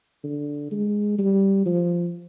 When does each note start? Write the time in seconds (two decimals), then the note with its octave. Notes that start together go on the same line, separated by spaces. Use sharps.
0.24 D3
0.71 G#3
1.18 G3
1.66 F3